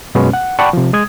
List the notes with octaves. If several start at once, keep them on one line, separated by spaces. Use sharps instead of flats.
F#2 B2 G#3 B3 C#4
F#5
D5 F#5 G5 A5 B5 C#6
C3 F3
G#3 D#6 G#6